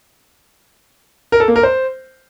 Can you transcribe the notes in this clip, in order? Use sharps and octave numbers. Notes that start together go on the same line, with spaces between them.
A#4
A4
A#3
A#4
C5